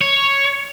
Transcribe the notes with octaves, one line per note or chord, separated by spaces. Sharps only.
C#5